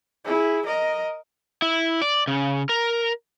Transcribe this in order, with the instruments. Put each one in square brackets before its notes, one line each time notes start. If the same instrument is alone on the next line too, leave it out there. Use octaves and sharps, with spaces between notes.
[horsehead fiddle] E4 G#4
A#4 D#5
[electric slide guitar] E4
D5
C#3
A#4